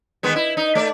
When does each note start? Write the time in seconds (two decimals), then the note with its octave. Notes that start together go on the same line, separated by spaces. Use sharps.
0.23 D#3 G#3 B3
0.36 E4
0.57 D#4
0.75 A3 D5